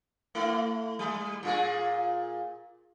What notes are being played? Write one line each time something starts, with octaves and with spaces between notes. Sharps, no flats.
A3 E4
G3
A#2 F4 G#4